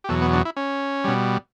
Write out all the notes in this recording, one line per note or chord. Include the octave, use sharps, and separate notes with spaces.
G4
E2 B2 F#3 A4
B3
D4
E4
C#4
B2 G3